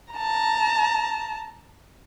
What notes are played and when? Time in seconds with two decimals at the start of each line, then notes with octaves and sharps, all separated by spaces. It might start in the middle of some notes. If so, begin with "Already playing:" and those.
0.14 A5 A#5